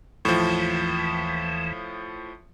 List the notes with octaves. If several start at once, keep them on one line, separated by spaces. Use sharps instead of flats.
D#2 A2 E3 F3